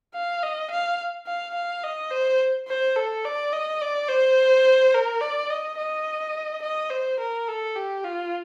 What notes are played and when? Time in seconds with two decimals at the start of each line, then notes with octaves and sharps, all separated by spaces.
0.14 F5
0.43 D#5
0.71 F5
1.26 F5
1.54 F5
1.84 D#5
2.11 C5
2.68 C5
2.96 A4
3.24 D5
3.53 D#5
3.81 D5
4.09 C5
4.94 A#4
5.21 D5
5.50 D#5
5.77 D#5
6.62 D#5
6.90 C5
7.20 A#4
7.48 A4
7.76 G4
8.04 F4